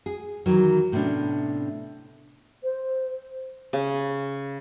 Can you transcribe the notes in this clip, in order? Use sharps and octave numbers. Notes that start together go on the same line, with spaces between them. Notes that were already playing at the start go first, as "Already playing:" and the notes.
G#4
D#3 E3 F#3
A2 C3 B3 C#4 D4
C5
C#3